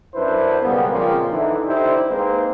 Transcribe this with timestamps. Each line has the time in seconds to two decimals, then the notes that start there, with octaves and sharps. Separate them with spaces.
0.14 F#2 D4 E4 B4 C5
0.62 B1 C#3 G3 A#3 B3
0.91 A#2 C#3 F3 G#3 A#3 C4
1.32 D3 E3 D#4
1.67 D3 D#4 E4 G4 C5
2.09 G#3 A#3 C4 D#4 B4 C5